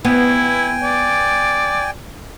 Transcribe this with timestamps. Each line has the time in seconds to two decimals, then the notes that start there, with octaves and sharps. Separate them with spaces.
0.05 B3 E4 G5 G#5
0.83 D5